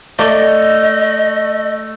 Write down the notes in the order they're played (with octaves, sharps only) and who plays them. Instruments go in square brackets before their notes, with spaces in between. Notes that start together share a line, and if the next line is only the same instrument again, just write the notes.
[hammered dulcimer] A3 [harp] D5 [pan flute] D#5